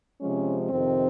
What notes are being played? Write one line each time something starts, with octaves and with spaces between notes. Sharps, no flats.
C3 F3 G#3 C#4
F2 C3 D#3 C4